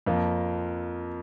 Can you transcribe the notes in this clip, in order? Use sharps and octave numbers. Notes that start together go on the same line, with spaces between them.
F2 F3 A#3